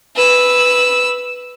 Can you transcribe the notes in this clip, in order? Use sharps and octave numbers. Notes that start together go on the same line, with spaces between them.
B4 E6